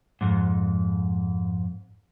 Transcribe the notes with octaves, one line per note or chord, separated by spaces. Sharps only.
F2 G#2